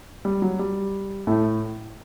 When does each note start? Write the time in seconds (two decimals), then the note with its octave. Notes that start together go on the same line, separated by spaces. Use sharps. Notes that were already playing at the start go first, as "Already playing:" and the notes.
0.25 G3
0.42 F#3
0.59 G3
1.27 A2 A3